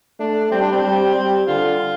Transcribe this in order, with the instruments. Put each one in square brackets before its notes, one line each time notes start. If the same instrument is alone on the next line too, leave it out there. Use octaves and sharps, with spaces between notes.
[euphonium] A3 [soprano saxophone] D4
[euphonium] G3 [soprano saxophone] C4
[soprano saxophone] D4
C4
[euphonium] G3
G3
[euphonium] D3 [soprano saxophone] F4